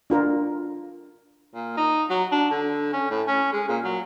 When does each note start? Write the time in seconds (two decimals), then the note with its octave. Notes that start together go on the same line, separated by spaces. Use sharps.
0.10 D4 F4 A#4
1.54 A#2
1.77 D#4
2.10 F#3
2.32 D4
2.50 D3
2.93 C#4
3.10 A2
3.27 C#4
3.53 G#3
3.69 A#2
3.84 F#3